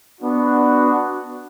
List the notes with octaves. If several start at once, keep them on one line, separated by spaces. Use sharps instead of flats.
B3 D4 F#4